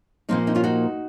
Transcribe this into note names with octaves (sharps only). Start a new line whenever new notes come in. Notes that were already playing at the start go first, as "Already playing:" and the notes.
A#2 F3 A#3 C4 D#4
C4 D#4
C#4 F4
D#4 F#4